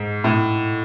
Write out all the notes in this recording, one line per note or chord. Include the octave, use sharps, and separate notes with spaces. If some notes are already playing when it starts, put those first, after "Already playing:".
Already playing: G#2
A2